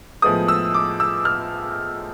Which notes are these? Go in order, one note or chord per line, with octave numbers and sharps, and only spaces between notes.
A2 F3 G#3 B3 D#6
E6
D6
E6
F6